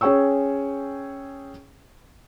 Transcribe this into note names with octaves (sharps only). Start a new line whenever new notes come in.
C#4 G#4 C#5 G5 C#6 E6